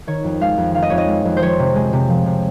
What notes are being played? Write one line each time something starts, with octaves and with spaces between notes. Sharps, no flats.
D#3 C#5
F2
G#3 F5
F2
D#3 F5
D#5
F2 C#5
D#5
G#3
F2
C5
F3 C#5
C3
G#3
C3
F3
C3